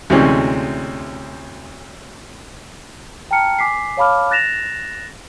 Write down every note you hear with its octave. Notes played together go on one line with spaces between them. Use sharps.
D2 C3 E3 G#3 C#4
G5 A5 A#5 F6 C#7
G#5 D6 B6 C7
C#5 F5 A5 B5 D6 F6
F#6 A6 A#6 E7 F7